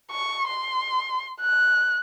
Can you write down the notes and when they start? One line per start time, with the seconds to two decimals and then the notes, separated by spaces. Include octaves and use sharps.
0.11 C#6
0.47 C6
1.40 F#6